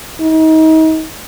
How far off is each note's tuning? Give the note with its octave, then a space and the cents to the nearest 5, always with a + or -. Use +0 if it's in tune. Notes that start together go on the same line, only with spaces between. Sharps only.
D#4 +35